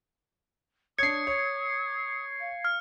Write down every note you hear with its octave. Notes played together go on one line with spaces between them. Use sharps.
D4 C#5 D#6 G#6 C7 C#7
C#5
F5
F6